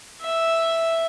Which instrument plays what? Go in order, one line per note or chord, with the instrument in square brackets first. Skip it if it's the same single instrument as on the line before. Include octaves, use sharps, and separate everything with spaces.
[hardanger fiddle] E5